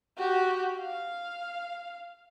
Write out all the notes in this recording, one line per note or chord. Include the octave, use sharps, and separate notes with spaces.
F#4 G4
F5